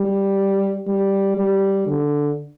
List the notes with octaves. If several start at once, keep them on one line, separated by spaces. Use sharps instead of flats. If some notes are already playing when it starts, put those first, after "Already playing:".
Already playing: G3
G3
G3
D3